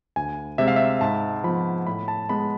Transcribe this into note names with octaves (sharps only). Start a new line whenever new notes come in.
D2 G#5
C3 G#3 E5
F5
E5
G#2 A5
F3 B3 B5
A2 B5
A5
G#3 B3 B5